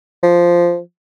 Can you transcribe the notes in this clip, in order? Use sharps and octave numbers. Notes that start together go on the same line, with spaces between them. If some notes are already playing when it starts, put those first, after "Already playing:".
F3